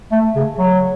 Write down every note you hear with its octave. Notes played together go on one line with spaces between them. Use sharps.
A3
C#3
F#3